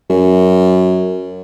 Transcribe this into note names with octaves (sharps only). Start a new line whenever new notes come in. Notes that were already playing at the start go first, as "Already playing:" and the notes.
F#2